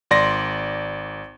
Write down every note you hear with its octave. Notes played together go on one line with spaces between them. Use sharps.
G#1 D5 C6 A#6